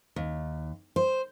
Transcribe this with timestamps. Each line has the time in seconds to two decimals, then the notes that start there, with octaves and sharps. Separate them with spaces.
0.16 D#2
0.96 C5